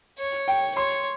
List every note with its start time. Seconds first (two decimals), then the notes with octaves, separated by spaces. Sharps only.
0.19 C#5
0.48 G5
0.76 C#5 C6